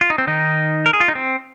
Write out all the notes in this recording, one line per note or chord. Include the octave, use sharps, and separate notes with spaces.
F4
D#4
C4
D#3 D#4
A#4
G#4
F4
D#4
C4